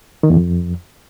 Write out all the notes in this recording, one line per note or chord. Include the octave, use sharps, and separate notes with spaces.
D#3
E2
F2